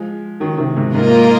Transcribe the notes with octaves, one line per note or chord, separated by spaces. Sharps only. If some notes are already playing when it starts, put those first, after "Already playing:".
Already playing: F3 G#3
D#3 F#3
C3 D#3
G#2 C3
G#2 C3 A#3 F4 A#4 D#5